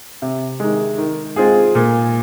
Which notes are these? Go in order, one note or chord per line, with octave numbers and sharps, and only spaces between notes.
C3
D#3 G#3
D#3
G#3 C4 F4 G#4
A#2